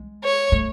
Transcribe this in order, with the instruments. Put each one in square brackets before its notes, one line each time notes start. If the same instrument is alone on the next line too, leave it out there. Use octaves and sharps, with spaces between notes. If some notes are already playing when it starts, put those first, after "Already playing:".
Already playing: [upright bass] G#3
[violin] C#5
[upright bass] A3